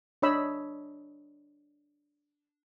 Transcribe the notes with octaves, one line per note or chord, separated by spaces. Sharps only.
D4 C#5 D#5 B5 E6